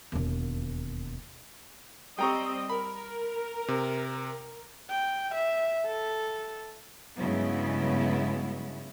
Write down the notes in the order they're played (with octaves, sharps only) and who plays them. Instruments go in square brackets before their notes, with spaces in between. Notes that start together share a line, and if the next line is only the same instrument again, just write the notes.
[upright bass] E1 D#2
[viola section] G3 C4 D#5 [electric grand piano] G5 A#5 C#6
[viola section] A#4 [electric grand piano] B5
[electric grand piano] C3
[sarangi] G5
E5
A4
[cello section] G2 C#3 F#3 G#3 B3 E4